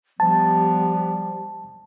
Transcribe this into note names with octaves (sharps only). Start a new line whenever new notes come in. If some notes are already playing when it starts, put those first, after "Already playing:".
F3 G3 B3 A5